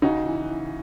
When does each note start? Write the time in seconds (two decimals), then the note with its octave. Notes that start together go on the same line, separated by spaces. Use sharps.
0.02 C#3 D#4 F#4
0.26 E3
0.49 E3